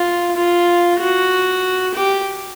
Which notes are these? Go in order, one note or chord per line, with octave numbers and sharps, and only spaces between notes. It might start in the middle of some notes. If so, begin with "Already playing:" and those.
Already playing: F4
F4
F#4
G4